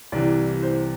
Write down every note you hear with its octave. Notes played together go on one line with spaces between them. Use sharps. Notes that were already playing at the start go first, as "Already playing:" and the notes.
C2 C3 E3 D5
C5